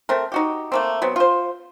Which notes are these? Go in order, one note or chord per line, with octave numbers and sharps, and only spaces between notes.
A3 C4 A#4
D#4 F#4 G4
A3 A#3 C4
F#3 B3 C4
F4 C5